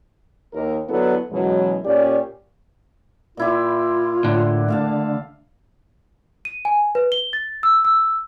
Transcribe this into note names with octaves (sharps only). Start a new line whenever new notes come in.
D#2 A#4
D3 F#3 B3 D4 E4 A4
F#2 B2 E3 F#3 G#3
A#2 C#4 G4 D5
A#2 E4 F4 G4
A2 D3
A3 E5 F5 A5
D#7
G#5
B4
G7
A6
E6
E6